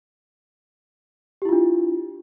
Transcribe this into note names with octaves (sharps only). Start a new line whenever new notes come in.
D4 E4 F4 G4